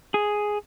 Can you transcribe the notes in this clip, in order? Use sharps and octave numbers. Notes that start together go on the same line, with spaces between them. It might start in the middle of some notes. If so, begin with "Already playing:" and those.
G#4